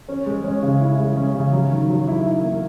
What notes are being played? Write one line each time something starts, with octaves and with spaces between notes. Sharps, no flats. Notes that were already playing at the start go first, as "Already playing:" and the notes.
C#4
G#3
C#4
C#3
E4
G#3
C#4
C#3
F#3
D#3
F#3
E4
E4
A#3